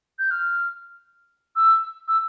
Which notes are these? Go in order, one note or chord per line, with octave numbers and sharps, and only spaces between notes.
G6
F6
E6
E6